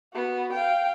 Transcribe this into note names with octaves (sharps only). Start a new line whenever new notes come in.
B3 F#4
F5 G5